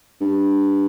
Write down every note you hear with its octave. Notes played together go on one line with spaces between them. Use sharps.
G2